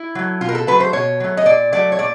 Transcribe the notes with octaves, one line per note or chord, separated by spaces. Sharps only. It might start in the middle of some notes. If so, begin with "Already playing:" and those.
Already playing: E4
F#3 A3
B2 F4
A#4
A4
F#3 A3 B4
C5
B2 C#5
F#3 A3
D#5
A#2 D5
F#3 A3 D5
C#5
A#2 D5